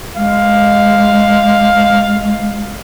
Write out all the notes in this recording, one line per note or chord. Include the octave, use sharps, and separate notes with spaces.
G#3 F5